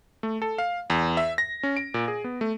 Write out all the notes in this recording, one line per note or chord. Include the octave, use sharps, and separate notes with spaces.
A3
A4
F5
E2
E5
A#6
C#4
D7
A#2
G#4
B3
A3